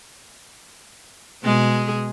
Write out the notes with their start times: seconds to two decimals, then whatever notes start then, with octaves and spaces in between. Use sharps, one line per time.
1.43 B2 G#3 G#4